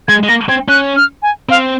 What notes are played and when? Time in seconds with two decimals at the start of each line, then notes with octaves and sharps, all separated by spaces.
0.08 G#3 G#6
0.23 G#3
0.28 A#3 A#6
0.49 C4 G#6
0.68 C#4 F#6
0.96 F6
1.22 G#5
1.49 C4 F5